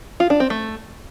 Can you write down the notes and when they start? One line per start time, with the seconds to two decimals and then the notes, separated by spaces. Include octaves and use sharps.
0.20 F4
0.30 D4
0.40 C4
0.50 A3